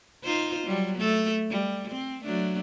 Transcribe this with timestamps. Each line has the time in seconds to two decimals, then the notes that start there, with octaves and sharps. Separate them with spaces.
0.24 D#4 F4 C5
0.67 F#3 G3
0.98 A3 A4
1.50 G3
1.91 C4
2.24 F#3 A3 D4